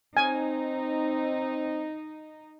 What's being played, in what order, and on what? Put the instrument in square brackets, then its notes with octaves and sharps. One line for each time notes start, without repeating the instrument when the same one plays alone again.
[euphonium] C4 [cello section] D#4 [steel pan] G#5